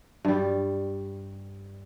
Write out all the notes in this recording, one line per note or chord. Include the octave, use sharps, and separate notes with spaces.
G2 G3